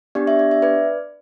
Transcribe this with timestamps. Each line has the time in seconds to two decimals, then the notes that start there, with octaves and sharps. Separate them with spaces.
0.15 B3 D4 G4 D5
0.27 E5
0.39 D5
0.51 E5
0.62 B4 D5